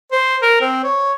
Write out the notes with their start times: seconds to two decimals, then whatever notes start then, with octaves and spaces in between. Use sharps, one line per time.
0.12 C5
0.42 A#4
0.61 C4
0.84 C#5